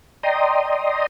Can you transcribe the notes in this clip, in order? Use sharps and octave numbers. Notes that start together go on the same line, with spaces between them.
D5 D#5 G5 A#5 C6 D#6